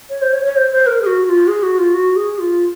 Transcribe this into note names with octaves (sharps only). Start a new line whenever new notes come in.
C#5
C5
C#5
C#5
C5
C5
A#4
G#4
F#4
F#4
F4
G#4
F#4
F4
F#4
G#4
F4